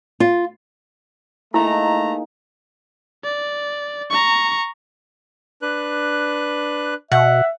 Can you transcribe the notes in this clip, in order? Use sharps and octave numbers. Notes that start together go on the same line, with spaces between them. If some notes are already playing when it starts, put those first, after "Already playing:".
F4
A3 A#3 D#4 E4 G#4 A#5
D5
A#5 C#6
D4 B4 F#6
B2 E5 F#5